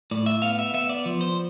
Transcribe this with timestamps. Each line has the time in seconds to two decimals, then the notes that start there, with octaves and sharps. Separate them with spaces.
0.11 A2 D5
0.26 E5
0.42 B3 F5
0.59 E5
0.74 B3 E5
0.89 D5
1.05 F3
1.21 C5